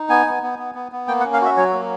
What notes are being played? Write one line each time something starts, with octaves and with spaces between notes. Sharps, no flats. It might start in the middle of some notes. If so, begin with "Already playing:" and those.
Already playing: D#4
B3 G#5
B3
B3
B3
B3
B3
A#3 G5
F#5
C#4
F5
F#4 E5
F#3 C#5
A#3